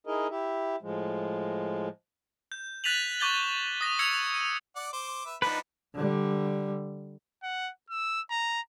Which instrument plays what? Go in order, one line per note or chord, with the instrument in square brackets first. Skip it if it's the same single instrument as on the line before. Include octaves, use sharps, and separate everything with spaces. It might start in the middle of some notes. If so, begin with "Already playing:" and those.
[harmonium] D#4 E4 G#4 A#4 D#5
E4 G4 E5
A2 F3 G#3
[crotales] G6
F#6 A6 B6 D#7 F7 F#7
C#6 D6 G6 A6 F#7 G7
D#6 A#6 D#7
E6 G#6 A#6 C#7 F7
D#7
[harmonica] D5 F#5 D6
C5 D6
B4 E5
[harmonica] F3 B3 D4 [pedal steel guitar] D#4 B4
[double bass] D3 G3
[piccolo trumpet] F#5
E6
A#5